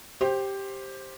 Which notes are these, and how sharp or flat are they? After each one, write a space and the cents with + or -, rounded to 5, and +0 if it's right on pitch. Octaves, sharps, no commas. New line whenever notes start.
G4 +0 C5 +15